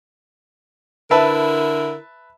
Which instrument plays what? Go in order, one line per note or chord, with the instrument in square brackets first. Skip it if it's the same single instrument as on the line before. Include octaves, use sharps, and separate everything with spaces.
[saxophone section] D3 E4 A#4 [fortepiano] B4 E5 A5